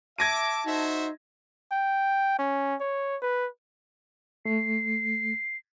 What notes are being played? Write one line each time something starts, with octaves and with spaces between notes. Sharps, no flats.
E5 A5 D6 G#6 A#6 D#7
D#4 F#4 C5 E5
G5
C#4
C#5
B4
A3 C7